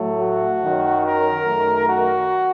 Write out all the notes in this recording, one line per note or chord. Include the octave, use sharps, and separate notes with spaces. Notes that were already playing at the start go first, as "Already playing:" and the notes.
Already playing: A2 F#3 A3
F#4
F#2 D#3 F#3
A#4
F#2 D#3 A3
F#4